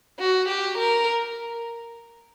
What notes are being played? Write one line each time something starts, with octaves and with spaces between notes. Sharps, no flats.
F#4
G4
A#4